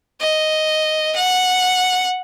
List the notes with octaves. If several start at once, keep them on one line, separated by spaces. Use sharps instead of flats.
D#5
F#5